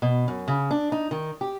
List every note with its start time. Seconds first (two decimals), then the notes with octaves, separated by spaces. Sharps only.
0.02 B2
0.28 F#2
0.48 C#3
0.71 D4
0.92 D#4
1.11 D#3
1.41 G4